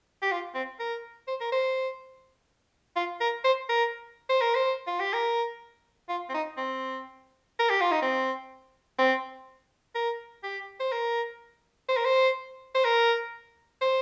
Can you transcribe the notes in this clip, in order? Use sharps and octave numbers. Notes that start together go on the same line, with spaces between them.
G4
F4
C4
A#4
C5
A#4
C5
F4
A#4
C5
A#4
C5
A#4
C5
F4
G4
A#4
F4
C4
D#4
C4
A#4
G4
F4
D#4
C4
C4
A#4
G4
C5
A#4
C5
A#4
C5
C5
A#4
C5